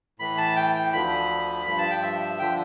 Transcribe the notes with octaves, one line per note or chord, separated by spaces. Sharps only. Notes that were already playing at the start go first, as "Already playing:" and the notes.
A2 E3 B5
A5
G5
G5
D2 D3 F3 B5
G2 F3 B5
A5
G5
E5
D3 F3 G5